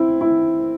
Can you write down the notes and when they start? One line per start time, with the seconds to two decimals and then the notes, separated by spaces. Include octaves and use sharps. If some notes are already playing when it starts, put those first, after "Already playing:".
Already playing: C4 E4
0.21 E4